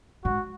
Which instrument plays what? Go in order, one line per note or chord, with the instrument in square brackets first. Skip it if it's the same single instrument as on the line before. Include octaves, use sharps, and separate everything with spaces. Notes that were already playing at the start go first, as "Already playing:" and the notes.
[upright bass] G#2 [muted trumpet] F#4